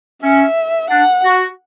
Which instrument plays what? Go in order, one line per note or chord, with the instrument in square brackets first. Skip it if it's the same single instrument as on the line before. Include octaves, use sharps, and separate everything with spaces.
[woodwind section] C#4 [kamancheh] E5
[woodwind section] D4 [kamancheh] F#5
[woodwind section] F#4